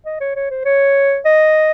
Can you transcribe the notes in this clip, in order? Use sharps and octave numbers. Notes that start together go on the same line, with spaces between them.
D#5
C#5
C#5
C5
C#5
D#5